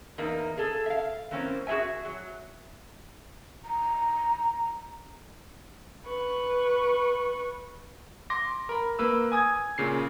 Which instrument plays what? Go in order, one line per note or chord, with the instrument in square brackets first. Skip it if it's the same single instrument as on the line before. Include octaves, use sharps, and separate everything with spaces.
[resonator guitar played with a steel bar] E2 A#3 D#4
G#4 A4
E5 F5
E3 A#3 C4 C#4
F#4 G#4 A4 E5 G#5
F#3
[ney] A#5
[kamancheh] B4 C#6
[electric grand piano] C6 D6 A#6
A#4 B5
A#3 B4 E6
G#5 D#6 G#6
A#2 C#3 C7